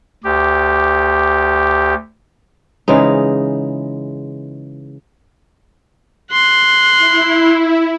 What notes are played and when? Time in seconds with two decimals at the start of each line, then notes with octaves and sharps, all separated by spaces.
0.24 D2 G4
2.88 C#3 E3 G#3 D#4
6.32 C6 F#6
6.97 E4